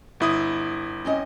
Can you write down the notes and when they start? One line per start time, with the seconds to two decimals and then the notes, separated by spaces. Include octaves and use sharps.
0.20 G1 E4 D#6
1.05 C4 C#4 D#5